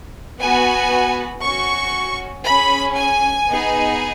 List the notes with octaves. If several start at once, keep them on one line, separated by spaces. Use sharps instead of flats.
B3 F#4 G#5
C#4 F#4 C#6
C#4 G#4 B5
G#5
B3 D#4 G#4